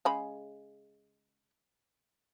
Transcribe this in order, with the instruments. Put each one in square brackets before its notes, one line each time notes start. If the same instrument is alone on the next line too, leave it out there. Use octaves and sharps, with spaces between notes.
[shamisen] C#3 G#3 B5